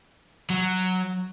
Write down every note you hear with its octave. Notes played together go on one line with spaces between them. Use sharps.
F#3